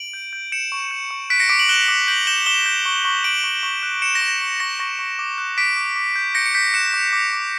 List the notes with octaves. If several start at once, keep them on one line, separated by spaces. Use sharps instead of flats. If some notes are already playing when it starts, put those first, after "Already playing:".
Already playing: D7 F#7
G6
G6
G6 C#7 E7
C#6
G6
C#6
F#6 B6 D7
A#6 C#7
D6 B6 D7
D7 F#7
F#6 E7 G7
D6
G6 D7 F#7
G6 E7 G7
D6 E7 G7
G6
C#6
C#6
C#6 D7 F#7
C#6
C#6
F#6
F#6 C#7 E7
A#6
C#6
A#6
C#6
C#6 A#6
C#6 A#6
C#6
D6
F#6
D6 B6 D7
D6
D6
G6
G6 A#6 C#7
C#7
G6 B6
F#6 C#7 E7
D6
D6
D6